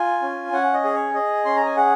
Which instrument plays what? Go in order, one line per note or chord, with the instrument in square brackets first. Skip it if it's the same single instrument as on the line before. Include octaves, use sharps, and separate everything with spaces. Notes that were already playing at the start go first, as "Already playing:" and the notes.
Already playing: [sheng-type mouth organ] F4 G#5
C#4
C#4 F#5
D#5
G#4
C#5
G#4 D#5
C#4 C6
A#5
G#5
G#4 F#5